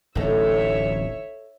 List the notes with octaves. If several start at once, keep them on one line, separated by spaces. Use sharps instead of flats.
D1 A1 D#4 A4 C#5 E5